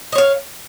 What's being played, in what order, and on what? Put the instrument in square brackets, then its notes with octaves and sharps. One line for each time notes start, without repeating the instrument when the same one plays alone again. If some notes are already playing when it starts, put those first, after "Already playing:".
[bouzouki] D#5
C#5
F5